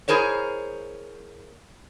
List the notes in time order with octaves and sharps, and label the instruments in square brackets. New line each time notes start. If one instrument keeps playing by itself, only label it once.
[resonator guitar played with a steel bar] E4 G#4 A#4 C5 C#5